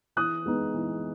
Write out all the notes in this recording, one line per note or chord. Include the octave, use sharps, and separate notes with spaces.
E3 D#6 F#6
G#3 B3 D#4
E3